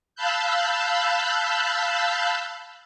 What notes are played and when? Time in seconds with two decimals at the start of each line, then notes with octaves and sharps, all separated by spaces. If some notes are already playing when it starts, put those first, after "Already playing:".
0.15 F5 A5 B5 E6 F#6 G6